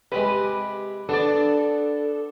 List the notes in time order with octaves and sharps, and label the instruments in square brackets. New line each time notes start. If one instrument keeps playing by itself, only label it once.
[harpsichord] C3 G#3 [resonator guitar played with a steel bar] G4 B4
[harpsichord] B3 [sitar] D4 D5 [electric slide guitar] A4